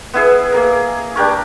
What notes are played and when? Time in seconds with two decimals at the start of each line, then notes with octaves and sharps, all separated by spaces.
0.14 B3 E4 G#4
0.52 A#3 G#4 A#4
1.16 D4 G4 A#4 C#5